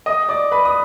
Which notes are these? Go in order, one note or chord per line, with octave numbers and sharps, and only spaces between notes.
D#5 D#6
D5 D6
B4 B5
D#6